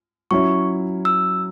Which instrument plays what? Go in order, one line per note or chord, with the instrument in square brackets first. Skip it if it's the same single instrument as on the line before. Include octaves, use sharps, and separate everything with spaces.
[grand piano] F#3 C#4 E4 C#5 [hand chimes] C#6
[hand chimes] E6